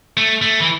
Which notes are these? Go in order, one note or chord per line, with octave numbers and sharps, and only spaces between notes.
A3
A3
E3